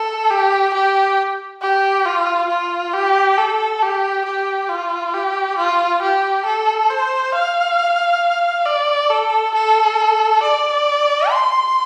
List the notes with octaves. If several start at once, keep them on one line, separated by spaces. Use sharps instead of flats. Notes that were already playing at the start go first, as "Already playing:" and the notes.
Already playing: A4
G4
G4
G4
F4
F4
G4
A4
G4
G4
F4
G4
F4
G4
A4
C5
F5
D5
A4
A4
D5
C6